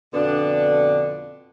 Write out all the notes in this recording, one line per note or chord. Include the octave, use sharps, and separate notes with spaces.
F2 B2 D3 B3 D4